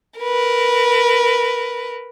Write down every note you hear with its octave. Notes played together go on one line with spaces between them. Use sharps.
A#4 B4